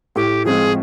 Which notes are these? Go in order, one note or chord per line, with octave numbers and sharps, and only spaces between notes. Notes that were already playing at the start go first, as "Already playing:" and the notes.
A2 G4
F3 G#3 C4 F4 G#4